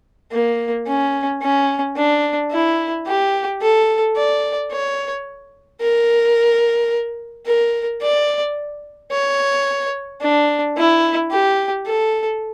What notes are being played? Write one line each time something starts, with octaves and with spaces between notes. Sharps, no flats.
A#3
C#4
C#4
D4
E4
G4
A4
D5
C#5
A#4
A#4
D5
C#5
D4
E4
G4
A4